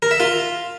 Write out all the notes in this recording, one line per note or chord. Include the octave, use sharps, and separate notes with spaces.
A#4
E5
F4